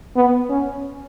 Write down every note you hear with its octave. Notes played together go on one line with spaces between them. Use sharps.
B3
C#4